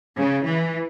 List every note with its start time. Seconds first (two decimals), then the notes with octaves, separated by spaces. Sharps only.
0.17 C#3
0.45 E3